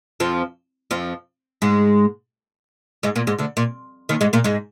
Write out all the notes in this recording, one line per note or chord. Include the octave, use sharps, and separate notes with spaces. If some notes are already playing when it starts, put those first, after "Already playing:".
F2 F3
F2 F3
G#2 G#3
G#2 G#3
A#2 A#3
G#2 G#3
D2 D3
A#2
D#2 D#3
G#2 G#3
A#2 A#3
G#2 G#3